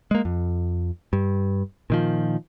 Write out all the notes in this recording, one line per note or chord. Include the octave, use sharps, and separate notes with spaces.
G#3 A#3
F2
G2
A#2 D#3 F3